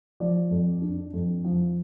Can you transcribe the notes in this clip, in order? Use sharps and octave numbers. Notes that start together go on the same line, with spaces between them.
F3 D5
F2
D4
F2
F3